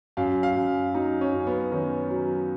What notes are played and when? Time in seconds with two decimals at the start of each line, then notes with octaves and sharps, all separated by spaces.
0.17 F#2 F5
0.43 F5
0.56 F#2
0.95 F#3 D#4
1.21 C#4
1.34 F#2
1.47 B3
1.72 D#3 C#4
2.10 F#3